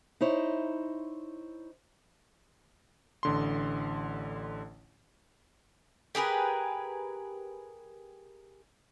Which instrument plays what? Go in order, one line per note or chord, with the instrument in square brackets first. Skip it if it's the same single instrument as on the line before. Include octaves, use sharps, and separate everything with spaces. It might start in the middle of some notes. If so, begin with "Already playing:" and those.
[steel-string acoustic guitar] D#4 E4 C5 C#5
[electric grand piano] A1 D3 C6
[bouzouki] G4 G#4 A#4 B4